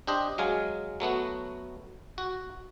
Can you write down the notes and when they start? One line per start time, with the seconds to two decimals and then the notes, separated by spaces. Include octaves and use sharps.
0.07 D4 G4 C5 D#5
0.38 F#3 G#3 F5 G#5
1.00 F#3 A3 B3 F#4
2.18 F#4